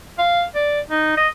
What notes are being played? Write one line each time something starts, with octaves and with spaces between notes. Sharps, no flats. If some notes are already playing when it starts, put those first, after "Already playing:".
F5
D5
D#4
D#5